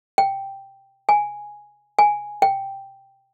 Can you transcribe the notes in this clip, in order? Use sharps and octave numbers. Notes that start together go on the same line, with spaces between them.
G5
G#5
G#5
G5